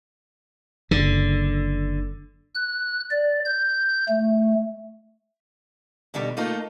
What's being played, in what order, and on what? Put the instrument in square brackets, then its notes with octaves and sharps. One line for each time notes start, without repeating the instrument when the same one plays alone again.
[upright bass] F#1 [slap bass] D3
[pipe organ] F#6
D5
G6
A3
[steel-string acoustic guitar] B2 D3 D#3 G3
A3 A#3 D#4 F4 A4